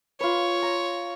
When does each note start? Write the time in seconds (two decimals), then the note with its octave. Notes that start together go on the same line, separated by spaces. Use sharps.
0.20 F4 B4 C#5
0.62 A#5